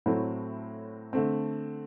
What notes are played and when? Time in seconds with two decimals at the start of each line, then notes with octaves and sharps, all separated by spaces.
0.06 A2 F#3 A3 C4 E4
1.13 D3 A3 C4